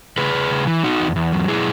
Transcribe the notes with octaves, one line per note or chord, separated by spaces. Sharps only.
C#3 G#4 B4
C#3
C#3
E3
B2 D#4 F#4
E2
E2
F#3
B2 E4 G#4